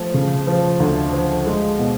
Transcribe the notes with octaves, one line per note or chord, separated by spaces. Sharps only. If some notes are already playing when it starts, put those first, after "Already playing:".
Already playing: F3 A3
C#3
F3
D2
F3
G#3
B2